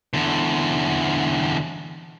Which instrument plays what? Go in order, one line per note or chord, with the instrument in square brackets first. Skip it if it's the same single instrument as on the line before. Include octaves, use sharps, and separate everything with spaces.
[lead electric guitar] E2 D3